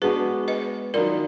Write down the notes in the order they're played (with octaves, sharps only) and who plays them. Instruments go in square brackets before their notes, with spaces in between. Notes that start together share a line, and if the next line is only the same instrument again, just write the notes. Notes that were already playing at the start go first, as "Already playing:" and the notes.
[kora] G#3 B3 D4 F#4 [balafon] G#4 B4
[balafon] B4 D#5
[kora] D#3 F#3 B3 F4 [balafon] A#4 D5